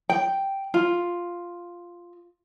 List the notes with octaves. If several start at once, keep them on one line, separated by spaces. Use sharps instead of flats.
G5
F4